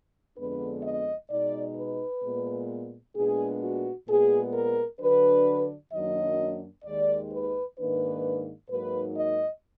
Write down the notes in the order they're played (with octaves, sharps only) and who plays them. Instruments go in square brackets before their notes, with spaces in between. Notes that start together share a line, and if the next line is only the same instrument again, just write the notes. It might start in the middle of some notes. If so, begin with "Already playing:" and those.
[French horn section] F2 D3 G#3 B3 D4 B4
D#5
B2 G#3 D#4 D5
B4
A#2 G#3 B3
A#2 G#3 B3 D4 G#4
F#4
A#2 G#3 B3 G#4
A#4
D3 F#3 D4 B4
F#2 D#3 F#3 A#3 D4 D#5
D#2 D#3 G#3 D5
B4
G#2 D#3 A#3 D4 B4
G#2 F#3 A#3 D#4 B4
D#5